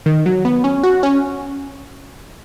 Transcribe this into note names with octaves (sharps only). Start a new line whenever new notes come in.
D#3
F#3
B3
C#4
F#4
C#4